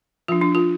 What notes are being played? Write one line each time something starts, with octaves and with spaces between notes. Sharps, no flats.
F3 D4 F4
D4
F4